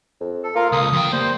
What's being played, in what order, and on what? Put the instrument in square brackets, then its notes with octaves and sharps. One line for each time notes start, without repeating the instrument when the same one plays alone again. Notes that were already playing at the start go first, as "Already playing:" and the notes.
[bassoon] F2
[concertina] A4
[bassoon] A#3 [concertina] F4 A#4 F5
[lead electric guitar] C#2 [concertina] D#6
[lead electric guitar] F2 G5
[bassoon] G3 [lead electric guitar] A#3 [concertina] C5